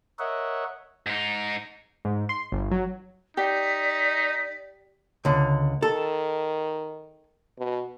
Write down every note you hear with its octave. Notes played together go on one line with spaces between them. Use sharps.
A#4 C#5 D#5 E5 F#5
G#2 D#4
G#2
C6
G1
F#3
D#4 G4 D5 B6
C#2 D3
D#3 A4
B2